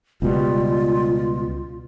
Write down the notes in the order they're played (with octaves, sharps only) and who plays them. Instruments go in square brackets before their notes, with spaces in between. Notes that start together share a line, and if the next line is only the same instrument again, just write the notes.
[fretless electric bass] C#2 B2 G3 [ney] F4